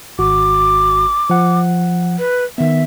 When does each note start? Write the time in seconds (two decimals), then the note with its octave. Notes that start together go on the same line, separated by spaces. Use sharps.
0.19 G#1 F#4 D6
1.30 F3 F#5
2.19 B4
2.58 D#3 B3 E5